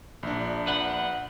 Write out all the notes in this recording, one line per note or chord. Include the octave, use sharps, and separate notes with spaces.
A#1 D4
B4 F#5